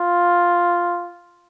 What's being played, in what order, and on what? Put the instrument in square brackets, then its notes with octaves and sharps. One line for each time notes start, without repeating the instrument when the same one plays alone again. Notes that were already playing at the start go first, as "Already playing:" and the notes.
Already playing: [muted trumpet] F4